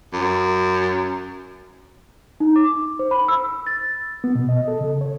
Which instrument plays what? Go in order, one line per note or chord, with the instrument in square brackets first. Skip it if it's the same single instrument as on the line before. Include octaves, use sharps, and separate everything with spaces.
[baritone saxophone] F#2
[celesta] D#4
D6
C5
B5
E6
A6
[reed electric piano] B3
B2
D#5
A4
C#3
C#5